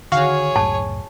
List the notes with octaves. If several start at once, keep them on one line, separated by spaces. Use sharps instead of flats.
D3 D#3 F#4 G#4 C#5 F5
C#2 F#2 A2 A5